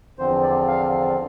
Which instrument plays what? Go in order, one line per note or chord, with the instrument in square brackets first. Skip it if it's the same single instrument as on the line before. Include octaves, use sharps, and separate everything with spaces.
[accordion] E2 D3 F3 C4 C5
D5
F5